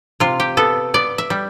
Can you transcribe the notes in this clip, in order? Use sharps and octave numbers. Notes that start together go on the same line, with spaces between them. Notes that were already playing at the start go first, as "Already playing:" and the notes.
C3 F4
G4
B3 A4
B3 D5
E5
G3